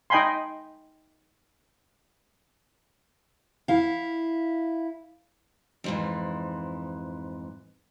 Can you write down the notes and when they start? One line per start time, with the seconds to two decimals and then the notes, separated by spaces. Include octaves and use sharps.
0.10 D#4 D#5 G5 G#5 B5 C6
3.68 E4 F5
5.84 F2 G#2 E3